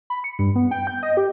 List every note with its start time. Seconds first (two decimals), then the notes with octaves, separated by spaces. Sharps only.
0.10 B5
0.24 C#7
0.39 G2
0.56 B3
0.71 G5
0.87 G6
1.03 D#5
1.17 G4